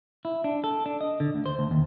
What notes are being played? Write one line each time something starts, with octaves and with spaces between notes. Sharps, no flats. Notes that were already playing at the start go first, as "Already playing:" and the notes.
E4
D4
A4
D4
D#5
D3
D2
C5
D2
D#2